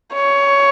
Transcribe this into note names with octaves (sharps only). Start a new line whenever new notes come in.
C#5